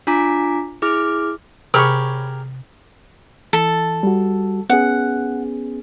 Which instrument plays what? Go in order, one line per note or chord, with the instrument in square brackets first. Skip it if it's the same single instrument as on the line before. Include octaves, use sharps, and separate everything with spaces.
[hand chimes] D4 F4 G#5 A#5 D6 B6
E4 G#4 D6 F6
[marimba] C3 [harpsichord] G4 G#4 A#4 [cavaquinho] C#5 B5 C#6
[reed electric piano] E3 A6 [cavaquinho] A4
[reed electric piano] G3 F#4
[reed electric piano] B3 C#4 G#4 [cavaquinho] F#5